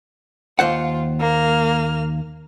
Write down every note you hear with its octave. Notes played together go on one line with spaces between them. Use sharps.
D#2 F4 C5 F#5
A#3 F6